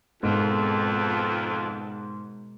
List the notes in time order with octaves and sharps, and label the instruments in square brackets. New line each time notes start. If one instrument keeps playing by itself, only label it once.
[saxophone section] F2 [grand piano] G#2 [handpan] B2 G#3 A#4 [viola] B3 A5